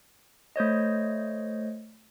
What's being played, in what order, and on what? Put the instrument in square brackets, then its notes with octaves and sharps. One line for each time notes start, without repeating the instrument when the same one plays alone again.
[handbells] A3 C5 C#5 D#5